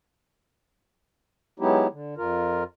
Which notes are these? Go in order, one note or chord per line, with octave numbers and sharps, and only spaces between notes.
F#3 G#3 B3 D#4 E4 G4
D3
F2 F4 A#4